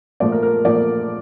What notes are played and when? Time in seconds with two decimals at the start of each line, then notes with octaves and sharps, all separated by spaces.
0.20 A#2 F3 A3 D5
0.32 A#4
0.43 A#4
0.64 A#2 F3 A3 D5